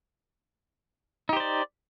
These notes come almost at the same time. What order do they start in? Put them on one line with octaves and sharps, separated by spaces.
D#4 G4 C5 D5